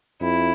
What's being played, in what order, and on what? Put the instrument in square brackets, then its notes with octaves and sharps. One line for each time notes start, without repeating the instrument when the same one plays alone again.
[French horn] F2 [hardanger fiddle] E4